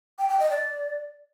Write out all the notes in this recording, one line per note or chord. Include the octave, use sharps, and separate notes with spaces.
G5
G5
D#5
D5